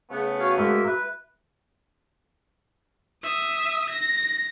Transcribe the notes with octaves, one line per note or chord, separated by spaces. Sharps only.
C#3 A3 B3 G#4
F#4 C#5 F5
A2 G#3 A#3 A#4 E5
B4 E5
E5 D#6
A#6